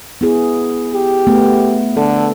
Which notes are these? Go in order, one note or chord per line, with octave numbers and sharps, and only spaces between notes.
B3 E4 G#4
G4
A3 B3
D3 A4